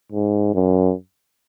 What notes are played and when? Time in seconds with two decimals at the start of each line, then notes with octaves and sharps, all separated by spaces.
0.12 G#2
0.54 F#2